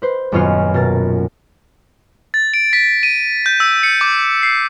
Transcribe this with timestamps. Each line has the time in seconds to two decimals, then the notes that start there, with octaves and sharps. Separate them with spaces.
0.02 B4 C5
0.32 D#1 F#2 B3 C#4 F4 F6
0.74 B2 A#4 A6
2.34 A6
2.54 D7
2.73 B6
3.03 D#7
3.46 G6
3.60 E6
3.83 C#7
4.01 D6
4.43 C7